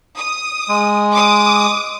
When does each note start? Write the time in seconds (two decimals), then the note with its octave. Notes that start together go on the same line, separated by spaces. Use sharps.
0.17 D#6
0.68 G#3
1.12 D6 D#6